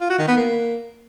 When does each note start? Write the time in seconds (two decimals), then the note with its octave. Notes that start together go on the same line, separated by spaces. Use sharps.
0.01 F4
0.10 F#4
0.19 D#3
0.28 B3
0.37 A#3